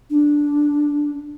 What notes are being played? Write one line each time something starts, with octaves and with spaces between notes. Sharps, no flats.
D4